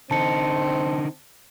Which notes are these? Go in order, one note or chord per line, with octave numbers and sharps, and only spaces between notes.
D3 C4 D#4 A5 C#7